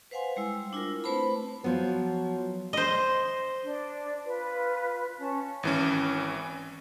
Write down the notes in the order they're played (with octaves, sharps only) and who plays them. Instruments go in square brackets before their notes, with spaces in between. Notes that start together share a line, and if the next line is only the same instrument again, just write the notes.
[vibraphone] B4 C5 F5 F#5 G#5 C6
G3 G#3 E4 E6
D4 E4 F4 A#4
A3 C4 B4 C5 A5 B5
[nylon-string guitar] F3 B3 [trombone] F#3
[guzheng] C5 D#5
[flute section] D4
F4 B4
C#4 A5
[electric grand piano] G#1 E3 C#4